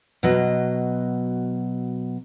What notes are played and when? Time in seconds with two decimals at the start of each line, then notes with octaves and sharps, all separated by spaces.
0.23 B2 F#3 D#5